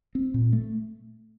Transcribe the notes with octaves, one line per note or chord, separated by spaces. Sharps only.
C4
A#2
A3